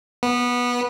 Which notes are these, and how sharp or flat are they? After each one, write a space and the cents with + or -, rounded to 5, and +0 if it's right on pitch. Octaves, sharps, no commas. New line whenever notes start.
B3 -15